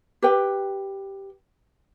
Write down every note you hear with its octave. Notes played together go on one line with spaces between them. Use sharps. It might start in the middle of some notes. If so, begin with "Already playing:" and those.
G4 B4 G5